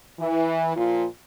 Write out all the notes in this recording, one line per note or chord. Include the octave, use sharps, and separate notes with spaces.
E3
A#2 F3 F4